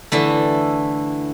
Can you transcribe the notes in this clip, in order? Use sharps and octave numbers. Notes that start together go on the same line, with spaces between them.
D3 E3 A3